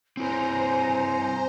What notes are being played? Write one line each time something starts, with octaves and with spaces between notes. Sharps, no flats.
C4 E4 B4 C5 G#5 A#5